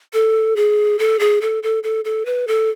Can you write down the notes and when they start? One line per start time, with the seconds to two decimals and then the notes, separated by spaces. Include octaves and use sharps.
0.13 A4
0.56 G#4
0.99 A4
1.19 G#4
1.41 A4
1.63 A4
1.83 A4
2.05 A4
2.26 B4
2.47 A4